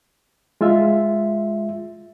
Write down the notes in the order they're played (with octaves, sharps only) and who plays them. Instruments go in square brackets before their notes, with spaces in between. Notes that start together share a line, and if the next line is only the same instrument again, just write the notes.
[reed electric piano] G#3 F4 E5